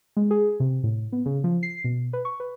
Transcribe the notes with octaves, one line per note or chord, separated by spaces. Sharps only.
G#3
G#4
C3
A2
B3
C#3
F3
C7
B2
B4
C#6
B4